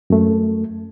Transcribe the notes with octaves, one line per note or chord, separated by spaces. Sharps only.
F#2 A3